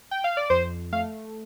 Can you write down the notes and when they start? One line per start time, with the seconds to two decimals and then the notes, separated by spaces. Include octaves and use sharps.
0.11 G5
0.24 F5
0.37 D5
0.50 F2 C5
0.92 A3 F5